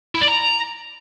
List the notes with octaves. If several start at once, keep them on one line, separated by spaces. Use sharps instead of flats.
E4
D5
A#5